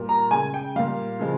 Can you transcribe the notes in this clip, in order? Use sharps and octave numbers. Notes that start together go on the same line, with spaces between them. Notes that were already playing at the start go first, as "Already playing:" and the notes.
Already playing: A#2 G3
A#5
C#3 G#3 G#5
G5
A#2 G3 F5
C#3 F3 G#3